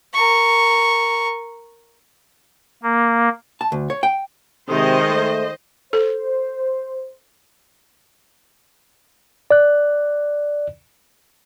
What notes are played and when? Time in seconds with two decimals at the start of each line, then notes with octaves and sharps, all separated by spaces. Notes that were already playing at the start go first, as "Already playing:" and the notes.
0.14 A#4 C#6
2.83 A#3
3.61 A5
3.72 D2
3.90 C#5
4.03 G5
4.69 C3 D#3 G#3 C5 D#5
5.09 A3
5.93 A4 C5
9.51 D5 F#6